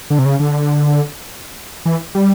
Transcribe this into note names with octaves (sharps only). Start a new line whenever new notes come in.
D3
C3
C#3
D3
E3
G3